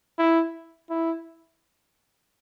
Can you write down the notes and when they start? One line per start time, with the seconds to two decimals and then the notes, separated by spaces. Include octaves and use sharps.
0.19 E4
0.90 E4